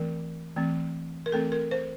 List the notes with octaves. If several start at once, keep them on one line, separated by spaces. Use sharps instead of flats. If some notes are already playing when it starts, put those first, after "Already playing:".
Already playing: E3 A3 C4 A#4
E3 A3 C4
A#4
E3 A3 C4 A4
A#4
C5